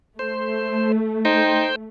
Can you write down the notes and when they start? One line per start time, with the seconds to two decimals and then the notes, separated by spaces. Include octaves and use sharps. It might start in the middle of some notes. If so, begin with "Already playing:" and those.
0.19 A3 C5
1.25 D#4 C5 G5